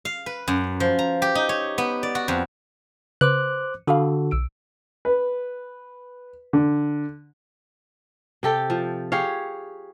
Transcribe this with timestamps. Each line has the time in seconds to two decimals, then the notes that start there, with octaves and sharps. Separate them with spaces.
0.05 F5
0.26 B4
0.48 F#2
0.80 F3
0.99 A#5
1.22 G4
1.35 D#4
1.49 C#5
1.78 B3
2.03 D5
2.15 F#4
2.28 F2
3.21 C#3 B4 C5 D6 F#6
3.87 D3 F#4 A4 F5 B5 D#6
4.31 B1 E6 D7
5.05 B4
6.53 D3
8.43 C3 G4 A4 G5
8.70 F3
9.12 G4 G#4 C#5 F5